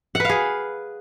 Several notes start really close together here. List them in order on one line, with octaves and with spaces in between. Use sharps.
F#5 B4 F5 G#4